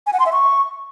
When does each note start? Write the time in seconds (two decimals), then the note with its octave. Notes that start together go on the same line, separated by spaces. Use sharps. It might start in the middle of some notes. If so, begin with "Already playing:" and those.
0.07 G#5
0.13 F#5
0.20 C6
0.26 E5
0.33 C#6